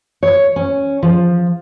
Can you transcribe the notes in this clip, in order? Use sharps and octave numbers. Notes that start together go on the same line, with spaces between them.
C#5
C#4
F3